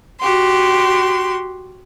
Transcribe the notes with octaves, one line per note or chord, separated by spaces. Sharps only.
F#4 G4 C6